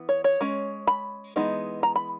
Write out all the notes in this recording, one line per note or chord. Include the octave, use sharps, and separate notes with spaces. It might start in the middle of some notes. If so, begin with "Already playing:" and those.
Already playing: E3 B3
C#5
C#5
G#3 C#4
B5
E3 G#3 B3 D#4
A#5
B5